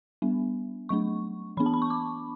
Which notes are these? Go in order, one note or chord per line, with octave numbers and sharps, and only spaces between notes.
G3 B3 D4
F#3 A3 D4 C#6
E3 B3 D4 B5
A5
B5
C#6
D6